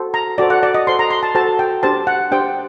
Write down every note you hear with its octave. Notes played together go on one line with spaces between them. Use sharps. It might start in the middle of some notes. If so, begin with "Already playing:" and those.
Already playing: F#4 A4 C5
A#5
F#4 A4 C5 D5
F#5
D5
D#5
F#4 A4 C5 C6
A#5
C6
A5
F#4 A4 C5 A5
G5
D4 G4 C5 A5
F#5
D4 G4 C5 G5